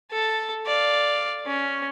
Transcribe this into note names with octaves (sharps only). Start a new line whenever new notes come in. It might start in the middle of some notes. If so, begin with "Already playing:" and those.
A4 A5
D5 F5
C#4